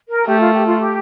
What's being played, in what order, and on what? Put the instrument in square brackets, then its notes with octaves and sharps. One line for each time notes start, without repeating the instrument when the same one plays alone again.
[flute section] A#4
[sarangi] A3 [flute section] G4
[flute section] F4
G4
F4
G4